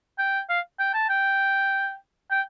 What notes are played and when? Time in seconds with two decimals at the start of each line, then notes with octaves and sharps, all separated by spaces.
0.19 G5
0.49 F5
0.79 G5
0.94 A5
1.09 G5
2.31 G5